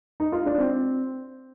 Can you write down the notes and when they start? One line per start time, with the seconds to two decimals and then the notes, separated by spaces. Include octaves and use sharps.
0.20 D#4
0.32 F4
0.46 D4
0.58 C4